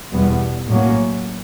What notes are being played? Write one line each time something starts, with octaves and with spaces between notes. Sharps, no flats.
E2 B2 G3 B3
A2 F#3 A#3 C#4